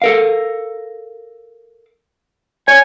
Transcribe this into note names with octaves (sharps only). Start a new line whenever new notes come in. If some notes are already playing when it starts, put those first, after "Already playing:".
A4 A#4 F5
C#5 G#5